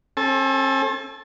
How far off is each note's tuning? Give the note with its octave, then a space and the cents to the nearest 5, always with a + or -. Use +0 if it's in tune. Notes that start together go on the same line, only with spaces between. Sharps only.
C4 +45 A4 +0 A5 -45